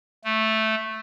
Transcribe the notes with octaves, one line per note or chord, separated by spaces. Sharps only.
A3